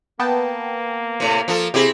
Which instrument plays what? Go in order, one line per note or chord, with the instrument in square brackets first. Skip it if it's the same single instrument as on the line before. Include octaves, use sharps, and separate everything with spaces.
[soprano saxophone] A#3 [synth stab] B3 G5 A5
[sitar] A2 C3
F3 F4 A4
[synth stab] C3 G#4 [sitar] C4 E4 G4